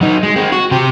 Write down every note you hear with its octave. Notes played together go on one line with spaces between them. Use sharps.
F#3 D#4
G#3
G#3 C4
F#4
C3 G4